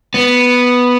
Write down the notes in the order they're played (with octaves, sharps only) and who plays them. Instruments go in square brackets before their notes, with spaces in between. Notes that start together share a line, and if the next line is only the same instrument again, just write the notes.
[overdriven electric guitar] B3